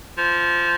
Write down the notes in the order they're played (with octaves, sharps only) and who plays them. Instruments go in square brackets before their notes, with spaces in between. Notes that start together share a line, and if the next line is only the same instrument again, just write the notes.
[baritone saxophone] F3